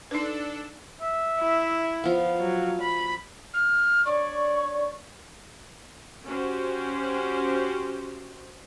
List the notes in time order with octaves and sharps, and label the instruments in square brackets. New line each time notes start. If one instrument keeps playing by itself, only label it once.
[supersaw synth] D4 A4 [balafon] D#4 B4
[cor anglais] E5
[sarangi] E4
[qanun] F3 B3 [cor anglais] F5
[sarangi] F#3
B5
[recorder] F6
[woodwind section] D4 C#5 C#6 [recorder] D5
[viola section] C#4 F#4 G4 C5